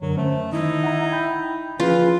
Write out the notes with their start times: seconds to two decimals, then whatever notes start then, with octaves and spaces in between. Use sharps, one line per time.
0.01 F#2 D3 F#3 A#4
0.17 A3 C#4 C5
0.52 D#3 D#4 E4
0.84 F#5 A#5
1.11 G5 B5 G6
1.80 E3 F3 C#4 F4 G#4 B4